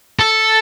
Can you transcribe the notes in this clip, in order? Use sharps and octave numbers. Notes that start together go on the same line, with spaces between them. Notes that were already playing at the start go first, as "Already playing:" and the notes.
A4